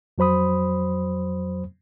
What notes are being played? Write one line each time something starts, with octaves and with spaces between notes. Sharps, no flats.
F2 F#3 C5 B5 D#6